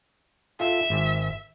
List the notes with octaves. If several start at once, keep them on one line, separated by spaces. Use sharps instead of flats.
F4 A4 E5
G#1